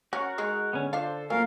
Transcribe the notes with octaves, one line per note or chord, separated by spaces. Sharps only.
C#4 F#4 A#4 F#5
G#3 D#4 G#4
D3 B3 C#4
D4 F4 A4 C5 F5
F#3 A3 A#3 F4 A#4 F5 G#5